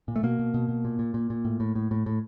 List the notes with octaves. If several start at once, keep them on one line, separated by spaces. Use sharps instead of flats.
A#2
A3
B2 A#3
B2
B2
B2
A#2
A#2
A#2
A#2
A2
A2
A2
A2
A2